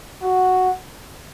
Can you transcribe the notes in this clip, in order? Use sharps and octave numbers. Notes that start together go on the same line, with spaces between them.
F#4